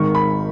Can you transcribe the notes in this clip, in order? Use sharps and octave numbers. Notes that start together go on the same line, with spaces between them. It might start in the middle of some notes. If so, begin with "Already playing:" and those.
Already playing: G#1 G#2 D#3 C#6
B5